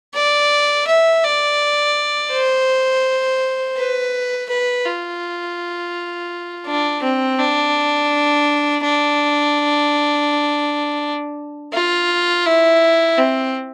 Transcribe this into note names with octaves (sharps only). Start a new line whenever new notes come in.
D5
E5
D5
C5
B4
B4
F4
D4
C4
D4
D4
F4
E4
C4